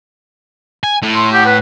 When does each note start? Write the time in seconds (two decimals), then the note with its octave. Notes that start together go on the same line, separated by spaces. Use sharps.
0.84 G#5
1.02 A2
1.15 C6
1.33 G4 F#5
1.46 B4